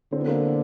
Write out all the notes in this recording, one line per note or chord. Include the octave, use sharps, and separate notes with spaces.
D3 C4
B3
A#3 C4